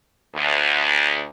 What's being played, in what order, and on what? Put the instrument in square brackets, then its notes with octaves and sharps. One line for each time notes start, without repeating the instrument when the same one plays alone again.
[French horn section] D2